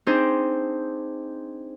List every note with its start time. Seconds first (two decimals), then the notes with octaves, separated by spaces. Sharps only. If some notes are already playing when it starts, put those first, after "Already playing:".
0.07 C4 D4 D#4 G#4 C5